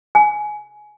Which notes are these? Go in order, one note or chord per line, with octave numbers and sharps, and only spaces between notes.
G#5